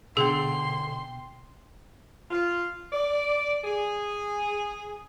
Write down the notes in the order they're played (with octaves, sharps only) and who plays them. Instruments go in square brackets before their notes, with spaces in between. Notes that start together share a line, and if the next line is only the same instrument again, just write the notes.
[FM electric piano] B2 G5 [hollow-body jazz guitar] D3 [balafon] G#4 [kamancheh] C6
[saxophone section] F4
D5
G#4